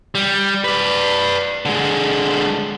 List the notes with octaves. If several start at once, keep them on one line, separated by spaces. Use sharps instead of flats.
G3
B4 D5
D3 G#3